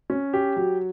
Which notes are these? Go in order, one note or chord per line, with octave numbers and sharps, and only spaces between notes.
C#4
G4
F#3